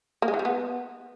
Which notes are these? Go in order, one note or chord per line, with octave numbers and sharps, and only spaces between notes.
A#3
G#3
E3
G3
B3